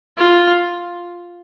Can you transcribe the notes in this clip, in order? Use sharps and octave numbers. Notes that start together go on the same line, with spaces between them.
F4